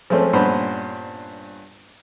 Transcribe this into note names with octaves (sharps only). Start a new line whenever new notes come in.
F3 G#3 A3 C4 C#4
G2 A#2 B3 C#4 C5 B5